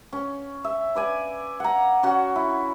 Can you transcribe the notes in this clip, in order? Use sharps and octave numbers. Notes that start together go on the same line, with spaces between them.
C#4
E5
B4 D5 G#5
F#5 A#5
C#4 F#4
E4